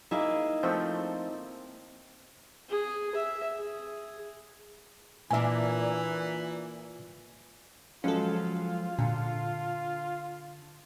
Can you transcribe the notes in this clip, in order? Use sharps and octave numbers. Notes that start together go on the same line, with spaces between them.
A#3 D#4 E4 G#4 D#5 E5
F3 A3 C4
G#4
E5
G#4
A#2 E3 D4 E5 G#5
F3 F#3 G#3 C#4 F4 A4
A#2 D3